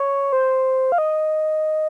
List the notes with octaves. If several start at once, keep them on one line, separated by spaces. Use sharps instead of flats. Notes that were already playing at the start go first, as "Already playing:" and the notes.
Already playing: C#5
C5
F5
D#5